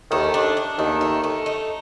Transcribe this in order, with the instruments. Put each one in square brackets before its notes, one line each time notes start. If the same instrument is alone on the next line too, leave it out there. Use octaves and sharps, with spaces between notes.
[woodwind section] D#2 D#3 [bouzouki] A3
[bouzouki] D4
D4
[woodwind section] D#2 D#3 [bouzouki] A3
[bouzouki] A3
A3
D#4